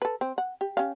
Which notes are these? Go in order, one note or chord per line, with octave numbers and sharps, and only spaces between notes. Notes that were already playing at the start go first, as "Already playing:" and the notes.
A4 B4
C4
F#5
G4
C#4 G4 F5